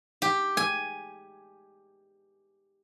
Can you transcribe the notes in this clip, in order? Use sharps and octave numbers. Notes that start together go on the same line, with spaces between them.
G4
G#5